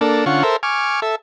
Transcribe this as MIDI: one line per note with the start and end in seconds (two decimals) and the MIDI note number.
0.01 0.25 58
0.01 0.25 62
0.01 0.25 69
0.26 0.43 50
0.26 0.43 61
0.26 0.43 65
0.26 0.43 78
0.26 0.43 85
0.43 0.57 69
0.43 0.57 70
0.43 0.57 72
0.43 0.57 76
0.63 1.00 80
0.63 1.00 85
0.63 1.00 86
0.63 1.00 89
1.02 1.15 69
1.02 1.15 76